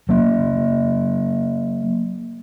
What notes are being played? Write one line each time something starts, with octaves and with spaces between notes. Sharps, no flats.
F#3 A#3